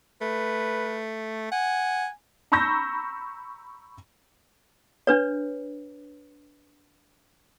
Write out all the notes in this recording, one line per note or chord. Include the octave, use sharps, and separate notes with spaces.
A3 B4
F#5 G#5
A#5 B5 C#6 E6 G6 A#6
D4 B4 C#5